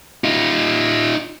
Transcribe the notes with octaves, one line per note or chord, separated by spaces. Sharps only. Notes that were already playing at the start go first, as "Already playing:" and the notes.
D#4 F4